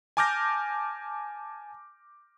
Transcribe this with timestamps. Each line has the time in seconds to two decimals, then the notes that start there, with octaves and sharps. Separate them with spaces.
0.17 G#5 A5 D6 F6 G6 A#6